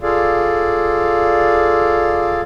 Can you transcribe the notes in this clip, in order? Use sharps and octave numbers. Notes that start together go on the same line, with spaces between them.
F4 G#4 A4 D5 F5